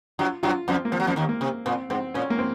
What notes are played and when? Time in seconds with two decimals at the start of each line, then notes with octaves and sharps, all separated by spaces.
0.19 F#2 F#3 F4
0.43 F#2 F#3 F4
0.68 F2 F3 C4
0.85 A#3
0.92 F3 C4
1.00 F#3
1.07 F2 F3
1.16 D#2 D#3
1.29 A#3
1.41 C3
1.66 A#2 C4
1.90 G#2 C4
2.14 A#2 C#4
2.30 A#3
2.39 C4